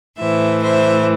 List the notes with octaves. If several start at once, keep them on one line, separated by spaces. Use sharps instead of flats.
A2 E3 C5 E5
C5 E5